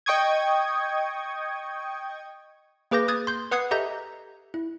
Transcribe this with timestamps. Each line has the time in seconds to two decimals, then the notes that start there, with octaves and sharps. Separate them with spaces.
0.06 D#5 G5 C#6 D#6 G#6
2.91 A#3 G#4 B4 D6 G6 A#6
3.08 D#6 F#6 G#6 A6
3.27 C6 G6
3.51 B4 F#5 D#6 F#6 G#6 C7
3.71 G4 A4 D#5 E5 A#5 G6
4.54 E4